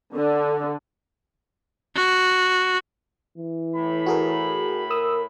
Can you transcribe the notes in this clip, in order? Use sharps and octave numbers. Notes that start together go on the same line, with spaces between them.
D3
F#4
E3
A2 B5
F#4 G#4 A#4
A#4 D#6 E6